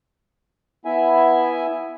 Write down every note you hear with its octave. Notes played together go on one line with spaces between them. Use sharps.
B3 E4 E5 G#5